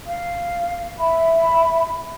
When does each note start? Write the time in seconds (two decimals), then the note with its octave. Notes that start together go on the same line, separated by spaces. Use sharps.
0.07 F5
0.99 E5 B5